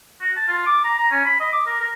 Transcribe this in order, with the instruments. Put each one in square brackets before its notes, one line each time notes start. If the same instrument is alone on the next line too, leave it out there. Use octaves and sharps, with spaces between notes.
[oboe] F#4
A5
F4
D6
A#5
A#5
C#4
B5
D#5
D6
A#4
A#4